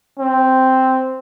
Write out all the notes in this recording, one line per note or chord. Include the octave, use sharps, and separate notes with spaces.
C4